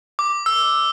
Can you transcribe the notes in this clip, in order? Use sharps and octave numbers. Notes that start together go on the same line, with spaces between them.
D6
E6